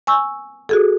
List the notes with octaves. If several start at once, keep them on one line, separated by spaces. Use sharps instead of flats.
G#5 C#6 E6
F#4 G#4 A4